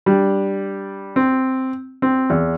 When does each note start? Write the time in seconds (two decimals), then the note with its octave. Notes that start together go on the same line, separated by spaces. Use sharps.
0.06 G3 D4
1.16 C4
2.02 C4
2.30 E2